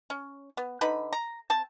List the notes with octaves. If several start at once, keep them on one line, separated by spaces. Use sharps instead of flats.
C#4
B3
D3 D#4 B4 B5
A#5
C4 A5